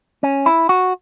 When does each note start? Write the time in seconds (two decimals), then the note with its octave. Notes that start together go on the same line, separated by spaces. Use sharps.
0.23 C#4
0.46 E4
0.69 F#4